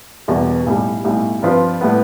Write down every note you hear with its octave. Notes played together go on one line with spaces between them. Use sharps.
E1 E2 B2 G3
B1 A2 G3
B1 A2 G3
G2 F3 C4 F4 B4
A2 G3 B3